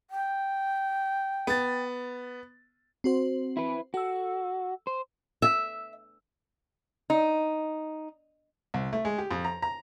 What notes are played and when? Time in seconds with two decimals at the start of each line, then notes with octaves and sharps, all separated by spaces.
0.11 G5
1.47 B3 A6
3.04 C4 F#4 C5
3.57 E4 B4
3.94 F#4 A4 E6
4.87 C5
5.42 E5
7.10 D#4
8.74 C2
8.93 A3
9.05 G#3
9.18 G4
9.31 F2
9.45 A#5
9.62 A#5